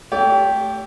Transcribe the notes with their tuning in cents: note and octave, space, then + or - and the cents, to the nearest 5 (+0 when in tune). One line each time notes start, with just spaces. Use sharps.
A3 +0 G4 +0 D5 -45